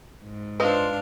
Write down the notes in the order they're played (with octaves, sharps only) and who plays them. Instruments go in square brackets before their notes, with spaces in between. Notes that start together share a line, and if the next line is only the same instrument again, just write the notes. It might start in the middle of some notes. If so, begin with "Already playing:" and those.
[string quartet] G#2
[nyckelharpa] D4 F5 [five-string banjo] F4 C5 D#5 [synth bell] B4